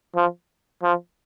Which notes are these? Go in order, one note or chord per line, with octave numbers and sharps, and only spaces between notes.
F3
F3